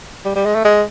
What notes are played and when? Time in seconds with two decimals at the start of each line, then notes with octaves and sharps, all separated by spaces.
0.25 G3
0.35 G3
0.45 G#3
0.55 A3
0.65 G#3